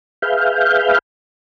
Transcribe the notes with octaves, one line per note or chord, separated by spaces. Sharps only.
G#4 B4 E5 F5 F6 G6